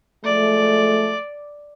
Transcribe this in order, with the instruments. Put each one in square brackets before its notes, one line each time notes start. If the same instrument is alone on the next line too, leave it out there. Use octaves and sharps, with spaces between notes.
[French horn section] F3 G#3 A3 [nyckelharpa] D5